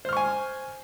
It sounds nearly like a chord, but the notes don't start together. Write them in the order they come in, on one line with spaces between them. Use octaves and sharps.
C5 F6 C#6 G#5